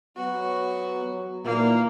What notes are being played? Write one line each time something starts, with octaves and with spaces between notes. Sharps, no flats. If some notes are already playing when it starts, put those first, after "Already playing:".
F#3 B3 F#4
F#3
A#2 D#3 E3 A#3